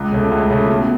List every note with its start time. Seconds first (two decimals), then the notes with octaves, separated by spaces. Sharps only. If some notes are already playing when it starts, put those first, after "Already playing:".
Already playing: C#2
0.12 C#3 A3
0.31 C#2
0.50 C#3 A3
0.69 B2